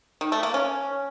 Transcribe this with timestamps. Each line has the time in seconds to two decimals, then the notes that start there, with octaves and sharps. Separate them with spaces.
0.21 D#3
0.32 A3
0.43 A#3
0.54 C#4